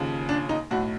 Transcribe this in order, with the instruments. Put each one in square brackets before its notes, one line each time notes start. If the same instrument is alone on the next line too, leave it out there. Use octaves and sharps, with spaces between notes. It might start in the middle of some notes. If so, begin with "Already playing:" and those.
Already playing: [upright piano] D#2 C#3 F3
D4
D#4
B1 A2 F#3 F#4